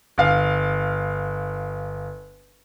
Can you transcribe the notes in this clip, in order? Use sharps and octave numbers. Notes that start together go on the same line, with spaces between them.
G1 F5